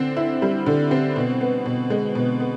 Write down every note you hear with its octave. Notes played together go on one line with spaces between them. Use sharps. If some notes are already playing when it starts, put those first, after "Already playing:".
Already playing: D3 C4
E4
G3
D3
C4
B2
B3
B2
G#3
B2
B3